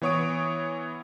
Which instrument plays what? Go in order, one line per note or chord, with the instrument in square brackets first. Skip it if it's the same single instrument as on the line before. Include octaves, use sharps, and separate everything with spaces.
[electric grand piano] E3 B3 C#5 C#6 D#6 D7